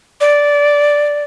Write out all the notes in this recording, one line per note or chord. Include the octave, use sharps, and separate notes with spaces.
D5